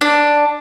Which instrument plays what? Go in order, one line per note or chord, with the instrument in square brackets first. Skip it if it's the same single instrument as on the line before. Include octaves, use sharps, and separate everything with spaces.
[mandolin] D4